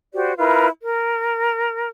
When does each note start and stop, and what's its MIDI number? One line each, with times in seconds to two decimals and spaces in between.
0.13 0.33 66
0.13 0.33 67
0.13 0.33 72
0.13 0.33 74
0.37 0.68 64
0.37 0.68 65
0.37 0.68 70
0.37 0.68 71
0.82 1.90 70